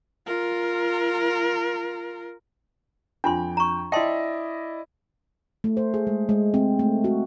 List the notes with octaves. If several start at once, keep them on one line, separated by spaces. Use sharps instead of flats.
F4 A#4
F2 D4 F4 G5 C6
A#5 C#6
E4 D5 D#5 G5 A5 C6
A3
C5
G#4
G#3
G#3
C4
A3
F#4